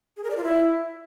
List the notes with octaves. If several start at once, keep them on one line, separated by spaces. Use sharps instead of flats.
G#4
A#4
D5
F4
E4